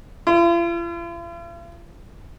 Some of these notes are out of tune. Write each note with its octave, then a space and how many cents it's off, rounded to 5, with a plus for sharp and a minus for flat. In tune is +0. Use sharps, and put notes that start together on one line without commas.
F4 -45